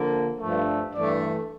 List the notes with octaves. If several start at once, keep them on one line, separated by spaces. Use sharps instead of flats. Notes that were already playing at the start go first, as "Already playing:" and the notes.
Already playing: D3 F3 A#3
G2 F3 A3
G2 E3 A3 D5